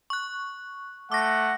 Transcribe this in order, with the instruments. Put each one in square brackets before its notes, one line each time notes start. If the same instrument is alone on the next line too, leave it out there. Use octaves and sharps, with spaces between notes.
[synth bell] C#6 F#6
[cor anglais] A3 [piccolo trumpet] F#5 [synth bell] D6 A#6